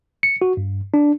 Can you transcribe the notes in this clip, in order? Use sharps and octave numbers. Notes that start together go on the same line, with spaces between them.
C#7
F#4
G2
D4